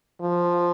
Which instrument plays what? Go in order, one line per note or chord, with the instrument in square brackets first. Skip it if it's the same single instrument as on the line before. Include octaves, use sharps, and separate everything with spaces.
[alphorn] F3